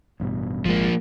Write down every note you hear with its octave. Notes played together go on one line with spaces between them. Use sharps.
A1 G2 B2
G#1 F3 G#3 A#3